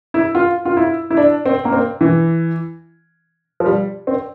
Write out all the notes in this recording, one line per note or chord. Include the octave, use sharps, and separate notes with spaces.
E4
F4
F4
E4
E4
D4
C4
A#3
C4
E3
F3
G3
C4